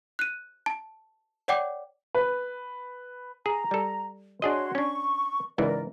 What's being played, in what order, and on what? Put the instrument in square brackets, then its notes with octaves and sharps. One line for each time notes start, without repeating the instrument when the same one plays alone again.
[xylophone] F#6 D#7
A5
C#5 D5 F#5 G5 D6
[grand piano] B4
[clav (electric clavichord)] G#4 [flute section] A#5
[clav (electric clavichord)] G3 A4
[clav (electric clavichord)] D4 G#4 D#5 [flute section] F#4 C#5 C6
[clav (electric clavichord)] C#4 D4 [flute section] C#6
[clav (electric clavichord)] C#2 G#2 E3 [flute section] A#4 D5